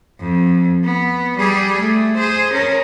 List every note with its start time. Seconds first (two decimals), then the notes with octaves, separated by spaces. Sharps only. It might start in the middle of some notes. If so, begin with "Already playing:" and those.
0.20 F2
0.84 B3
1.37 G3 G#4
1.80 A3
2.16 G#4 C5
2.53 C#4 A#4